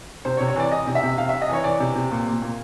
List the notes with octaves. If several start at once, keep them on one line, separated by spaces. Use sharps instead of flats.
C3 C5
C#5
C3
C#5
E3 D5
E3 D#5
C3
E5
C3
C3 F5
E5
C3
D#5
E3 C#5
E3 D5
C3
C3
A#2
A#2
A#2